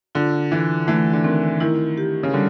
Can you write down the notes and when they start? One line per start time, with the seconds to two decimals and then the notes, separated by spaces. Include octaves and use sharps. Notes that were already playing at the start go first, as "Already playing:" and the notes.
0.15 D3 F4
0.51 E3 A4
0.87 E3 A3
1.13 D3
1.24 D#3 C4
1.60 D#3 E4
1.98 G4
2.23 C#3
2.34 D3 G3